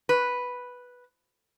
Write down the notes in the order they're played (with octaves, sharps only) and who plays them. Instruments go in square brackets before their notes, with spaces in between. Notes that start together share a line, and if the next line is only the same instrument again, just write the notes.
[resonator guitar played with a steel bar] B4